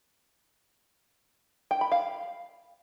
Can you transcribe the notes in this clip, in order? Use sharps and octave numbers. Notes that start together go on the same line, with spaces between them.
G5
B5
F5